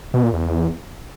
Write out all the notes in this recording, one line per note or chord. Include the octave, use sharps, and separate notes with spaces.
B2
A#2
E2